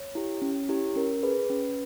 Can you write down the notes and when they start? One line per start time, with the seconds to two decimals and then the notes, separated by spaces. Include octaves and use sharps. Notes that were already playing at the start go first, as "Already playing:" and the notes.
Already playing: C#5
0.15 E4 G4
0.42 C#4
0.69 E4 G4
0.96 C#4 A#4
1.23 G#4 B4
1.50 C#4